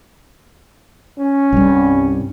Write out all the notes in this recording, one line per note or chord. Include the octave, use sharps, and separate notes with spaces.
C#4
C2 G2